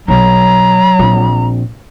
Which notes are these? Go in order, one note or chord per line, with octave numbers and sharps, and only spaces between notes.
B1 F#3 A#5
A#1 C4